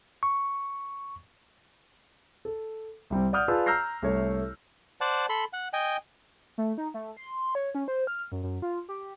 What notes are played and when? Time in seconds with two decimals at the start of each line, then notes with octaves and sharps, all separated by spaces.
0.23 C#6
2.45 A4
3.10 C2 G3 C4
3.33 D5 F#5 D#6 F6 G6
3.48 F4 G#4 B4 D5 A5 E6
3.66 A#5 E6 F6 G6 A#6 C7
4.02 C2 A3 C#5
5.01 C5 D5 F#5 A5
5.29 A4 B5 C6
5.53 F#5
5.73 D#5 G5 G#5
6.58 A3
6.78 D#4
6.94 A3
7.17 C6
7.55 C#5
7.75 C#4
7.88 C5
8.07 F6
8.32 F#2
8.43 F#2
8.62 F4
8.89 G4